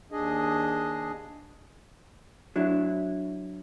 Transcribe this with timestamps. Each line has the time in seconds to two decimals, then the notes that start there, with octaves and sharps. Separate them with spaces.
0.12 D#2 D4 G#4 D#5
2.56 F#3 D4 E4